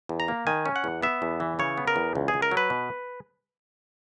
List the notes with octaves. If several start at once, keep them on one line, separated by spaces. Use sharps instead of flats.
E2
A#5
A#3
D#3 G#5
C#4
F#5
E2
B3 E5
E2
E3
C#3 C#5
B3
A#4
E2
C#2
G#4
C#2
A#4
F#3
B4
B2